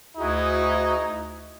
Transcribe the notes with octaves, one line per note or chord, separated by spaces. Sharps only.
D2 D#4 E4 F#4 G#4